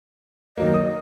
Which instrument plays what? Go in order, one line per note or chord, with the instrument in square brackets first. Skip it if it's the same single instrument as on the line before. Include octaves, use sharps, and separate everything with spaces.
[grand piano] D#3 F#3 A#3 [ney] D#5
[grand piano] D#6